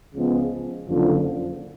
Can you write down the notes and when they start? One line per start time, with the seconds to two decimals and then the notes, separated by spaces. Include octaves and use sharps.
0.14 C#2 C#3 F3 G#3 B3
0.87 F#1 F2 D3 F3